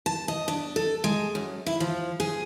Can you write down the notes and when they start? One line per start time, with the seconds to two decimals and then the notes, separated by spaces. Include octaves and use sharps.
0.06 A5
0.28 D#5
0.48 D4
0.76 A4
1.04 G#3
1.35 F#2
1.66 E4
1.80 F3
2.20 G#4